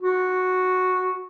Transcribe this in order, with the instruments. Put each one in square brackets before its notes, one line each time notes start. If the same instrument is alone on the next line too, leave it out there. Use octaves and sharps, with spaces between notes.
[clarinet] F#4